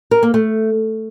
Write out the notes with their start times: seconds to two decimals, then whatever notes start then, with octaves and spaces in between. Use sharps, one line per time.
0.11 A#4
0.23 A#3
0.34 A3